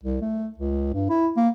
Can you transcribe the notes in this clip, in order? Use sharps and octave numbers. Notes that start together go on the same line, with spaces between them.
C2
A3
C#2
G2
E4
A#3